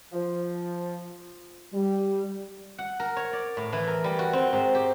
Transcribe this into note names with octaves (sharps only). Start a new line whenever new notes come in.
F3
G3
F#5
A#4
C#5
D5
A2
E3
A#4
G3
F#4
C4
G#2
G4